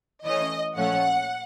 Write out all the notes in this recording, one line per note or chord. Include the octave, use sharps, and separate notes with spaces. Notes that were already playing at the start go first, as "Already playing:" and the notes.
E3 A3 C#4 D#5
A#2 F3 A3 C#4 F#5